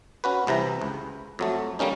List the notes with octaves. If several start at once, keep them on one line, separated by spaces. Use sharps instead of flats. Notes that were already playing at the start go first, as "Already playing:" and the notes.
C#4 F#4 B4
C2 C3 E3 A#5
C#2
F2 F#3 A3
D3 G3 A#3 C#4 D#4